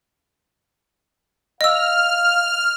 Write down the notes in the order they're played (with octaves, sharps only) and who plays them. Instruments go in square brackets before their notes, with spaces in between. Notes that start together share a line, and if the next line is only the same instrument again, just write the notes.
[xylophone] D#5 E6 [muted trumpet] F5 [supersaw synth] F6